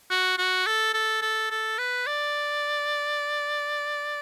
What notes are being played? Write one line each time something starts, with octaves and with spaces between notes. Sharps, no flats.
F#4
F#4
A4
A4
A4
A4
B4
D5